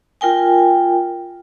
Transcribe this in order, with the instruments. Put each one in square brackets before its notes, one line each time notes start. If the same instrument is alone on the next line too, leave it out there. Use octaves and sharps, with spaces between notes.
[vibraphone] F4 A#4 G5 G#5